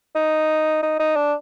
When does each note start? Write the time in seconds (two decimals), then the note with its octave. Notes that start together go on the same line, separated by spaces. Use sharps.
0.15 D#4
0.83 D#4
0.99 D#4
1.16 D4